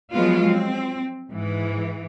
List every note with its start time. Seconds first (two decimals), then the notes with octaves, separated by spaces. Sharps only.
0.12 F3 F#3 G#3 B3 F4
0.50 C4
1.32 G#2 E3